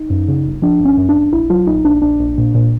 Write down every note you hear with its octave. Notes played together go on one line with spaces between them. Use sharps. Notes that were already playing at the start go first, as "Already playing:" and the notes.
Already playing: D#4
F#2
C#3
G1
F3 D4
G1
C#4
F#2
D4
G1
A#1 E4
F#3 F4
A#1 D#4
A#1 D4
A#1 D4
A#1
A#2
A#2